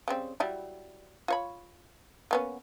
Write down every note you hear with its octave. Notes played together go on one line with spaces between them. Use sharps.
C#3 G3 C4
F#3 G3 E4
F4 C#5 B5
A#3 B3 C#4